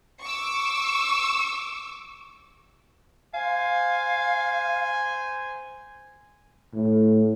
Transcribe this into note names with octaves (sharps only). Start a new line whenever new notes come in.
C#6 D6 E6
C5 F5 G#5
A2